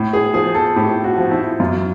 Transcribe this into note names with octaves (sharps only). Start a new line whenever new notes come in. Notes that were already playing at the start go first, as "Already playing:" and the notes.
Already playing: A2
G#4
F3 G#4
A4
A2 G4
F#4
F3
E4
F#2 F4